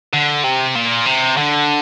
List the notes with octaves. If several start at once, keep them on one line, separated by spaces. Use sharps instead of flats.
D3
C3
A#2
C3
D3